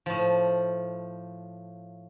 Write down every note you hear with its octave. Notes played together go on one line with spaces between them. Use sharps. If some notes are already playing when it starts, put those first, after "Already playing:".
A2 F3